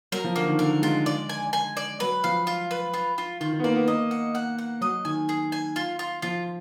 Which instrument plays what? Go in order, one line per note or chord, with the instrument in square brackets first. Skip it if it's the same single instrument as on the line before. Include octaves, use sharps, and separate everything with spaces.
[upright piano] F#3 [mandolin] A#4
[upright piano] F3
[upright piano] D3 [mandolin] A#3
[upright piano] D#3
[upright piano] D3 [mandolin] A#4
[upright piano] G#3 [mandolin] F4
[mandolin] D5
G#5
G#5
D5
[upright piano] F#3 [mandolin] B4
[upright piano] F3 [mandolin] F5
[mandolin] F4
B4
F4
F4
[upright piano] D#3 [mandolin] F4
[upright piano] D#3
B3
[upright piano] A#3 [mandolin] D5
[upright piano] B3
[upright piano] A#3 [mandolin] D#5
[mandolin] F#5
F#5
F#5
[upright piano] F#3 [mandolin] D#5
[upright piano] D#3 [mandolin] G#5
[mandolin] G#4
G#5
F4
F4
[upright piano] F3 [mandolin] F4